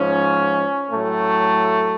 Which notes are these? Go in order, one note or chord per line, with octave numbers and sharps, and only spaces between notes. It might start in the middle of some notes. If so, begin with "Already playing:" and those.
Already playing: G#2 F3 C#4
A2 F#3 A3